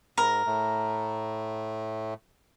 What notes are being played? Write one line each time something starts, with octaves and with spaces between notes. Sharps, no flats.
G#2 A#4
A2 A3